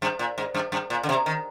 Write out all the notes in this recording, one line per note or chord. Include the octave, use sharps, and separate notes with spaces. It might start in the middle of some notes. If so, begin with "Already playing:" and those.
G2
A#2
G#2
G2
G2
A#2
D3
C3
D#3